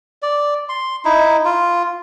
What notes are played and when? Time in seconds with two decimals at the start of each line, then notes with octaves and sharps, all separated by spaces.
0.22 D5
0.69 C6
1.05 D#4 E4
1.45 F4